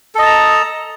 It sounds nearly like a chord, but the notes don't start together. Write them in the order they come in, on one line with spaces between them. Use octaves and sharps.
A4 D#5 A5 A#5